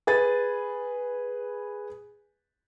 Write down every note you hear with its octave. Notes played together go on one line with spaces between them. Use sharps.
G#4 B4 A6